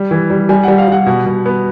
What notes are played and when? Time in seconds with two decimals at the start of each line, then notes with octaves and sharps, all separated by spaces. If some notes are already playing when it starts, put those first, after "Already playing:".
Already playing: G3
0.11 E3
0.30 G3
0.49 G3 G#5
0.63 G3 F#5
0.78 F5
0.88 G3 F#5
1.06 B2
1.26 B2
1.46 B3